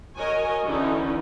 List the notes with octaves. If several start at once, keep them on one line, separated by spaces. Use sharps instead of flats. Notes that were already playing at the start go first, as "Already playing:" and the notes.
F#4 A#4 C#5 D#5 G#5
D3 E3 C#4 D#4